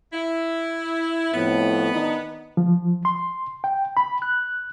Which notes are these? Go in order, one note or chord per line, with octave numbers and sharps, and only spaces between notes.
E4
F2 A2 B3
D#3 D4 D#4
F3
C6
G5
B5
F#6